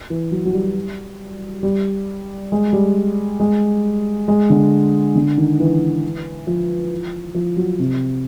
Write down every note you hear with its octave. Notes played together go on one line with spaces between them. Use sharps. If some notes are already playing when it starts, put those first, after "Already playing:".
E3
F#3
F#3
G3
G3
G#3
G3
G#3
G#3
D3
D3
D#3
E3
F3
F3
F#3
C3